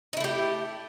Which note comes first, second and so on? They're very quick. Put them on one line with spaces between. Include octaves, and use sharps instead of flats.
D#4 E4 A3 G4